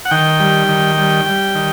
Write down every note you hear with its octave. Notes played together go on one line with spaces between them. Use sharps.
F#5
D#3 G5
G3
D#3
G3
G3
D#3